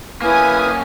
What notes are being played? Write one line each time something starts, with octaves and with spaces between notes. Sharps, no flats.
A#3 C#4 E4 B4 G#5 D#6 F6